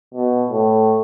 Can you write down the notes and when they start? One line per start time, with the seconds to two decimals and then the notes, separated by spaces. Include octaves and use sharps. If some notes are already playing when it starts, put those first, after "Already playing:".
0.14 B2
0.50 A2